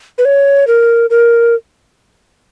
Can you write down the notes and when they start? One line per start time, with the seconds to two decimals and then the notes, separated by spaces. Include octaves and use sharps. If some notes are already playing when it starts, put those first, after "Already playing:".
0.18 B4
0.25 C#5
0.67 A#4
1.10 A#4